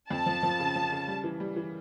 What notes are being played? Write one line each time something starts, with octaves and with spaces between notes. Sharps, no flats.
F2 A5
F3
F3
C#3
F3
C#3
G3
E3
G3
E3